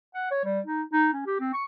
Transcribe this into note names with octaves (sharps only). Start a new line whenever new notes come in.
F#5
C#5
G3
D#4
D#4
C#4
G4
C4
C#6